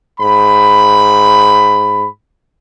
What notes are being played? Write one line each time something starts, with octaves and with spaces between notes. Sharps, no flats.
G#2 B5